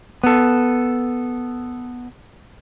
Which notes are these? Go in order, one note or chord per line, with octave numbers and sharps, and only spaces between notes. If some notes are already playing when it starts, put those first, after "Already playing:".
B3 A4